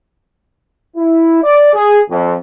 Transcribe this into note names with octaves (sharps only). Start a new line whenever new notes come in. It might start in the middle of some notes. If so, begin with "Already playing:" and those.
E4
D5
G#4
F2